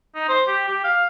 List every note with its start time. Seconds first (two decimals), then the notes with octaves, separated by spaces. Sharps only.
0.15 D#4
0.29 C5
0.48 G4
0.69 G4
0.84 F5